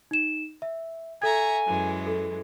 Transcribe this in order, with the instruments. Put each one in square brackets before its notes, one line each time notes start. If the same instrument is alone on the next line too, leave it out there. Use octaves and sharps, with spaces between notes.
[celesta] D#4 E7
E5
[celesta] A4 G#6 [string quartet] E5 A#5 C#6 [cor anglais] G#5
[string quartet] F#2 E3 G#3
[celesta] A4